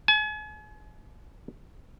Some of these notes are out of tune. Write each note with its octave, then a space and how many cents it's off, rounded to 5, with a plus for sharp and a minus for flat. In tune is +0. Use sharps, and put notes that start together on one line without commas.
G#5 +40